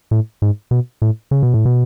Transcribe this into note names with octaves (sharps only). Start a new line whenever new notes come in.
A2
G#2
B2
A2
C#3
B2
A2
B2